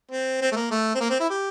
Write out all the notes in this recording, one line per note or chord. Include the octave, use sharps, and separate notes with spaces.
C4
C4
A3
A#3
A3
C4
A#3
C4
E4
G4